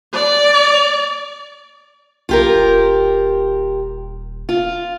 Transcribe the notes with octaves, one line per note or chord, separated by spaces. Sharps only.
D5
B1 F4 G4 A#4
D#1
F4